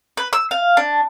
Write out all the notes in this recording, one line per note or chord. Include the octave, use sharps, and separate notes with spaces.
B4
E6
F5
D4